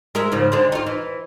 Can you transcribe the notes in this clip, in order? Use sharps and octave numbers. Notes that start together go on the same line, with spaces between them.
G#3 A#4 E5
G#2 C#3 F3
D3 G#3 C4
D#4 F4
E3